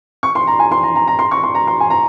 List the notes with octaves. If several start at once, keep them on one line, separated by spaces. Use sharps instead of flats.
C#6
C6
A#5
G#5
C6
A#5
A#5
A#5
C6
C#6
C6
A#5
C6
G#5
A#5